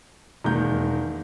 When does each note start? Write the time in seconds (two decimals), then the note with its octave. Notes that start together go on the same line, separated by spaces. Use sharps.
0.44 E1 D#3 G#3 A#3 A#5 G6